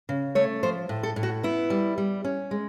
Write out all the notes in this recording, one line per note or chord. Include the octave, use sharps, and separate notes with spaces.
C#3
A3 C#5
F3 C5
A2
A4
A2
F#4
B3 E4
G3
G3
C#4
G#3